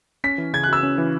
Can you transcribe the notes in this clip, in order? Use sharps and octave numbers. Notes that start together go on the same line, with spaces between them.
C#4 B6
E3
C#3 G#6
F#6
F#4 E6
C#4
E3